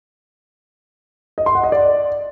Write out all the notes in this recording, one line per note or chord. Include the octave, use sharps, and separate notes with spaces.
D#5
C6
F#5
D#5
D5